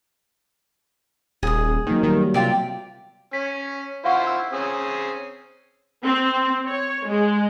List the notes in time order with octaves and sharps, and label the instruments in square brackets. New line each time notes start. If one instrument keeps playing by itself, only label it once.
[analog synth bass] D#1 [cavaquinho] G#4 D#6
[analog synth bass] D#3 [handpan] F#3 A#3 B3
[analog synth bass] D#3 [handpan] G3
[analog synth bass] C3 [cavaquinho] F4 G4 D5
[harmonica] C#4 [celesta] B6
[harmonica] E4 F4 C5 [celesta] F5 F#5 C#6
[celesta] E6
[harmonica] C4 C#4 G#4
[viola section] C4
C#5
G#3